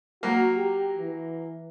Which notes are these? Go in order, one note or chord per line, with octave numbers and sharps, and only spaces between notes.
F#3 A#3 F#4
G4
E3